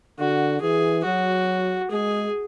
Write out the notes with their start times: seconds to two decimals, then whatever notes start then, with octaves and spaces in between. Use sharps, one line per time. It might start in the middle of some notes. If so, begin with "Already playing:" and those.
0.20 D3 F#4
0.62 E3 G#4
1.05 F#3 F#4
1.91 G#3 G#4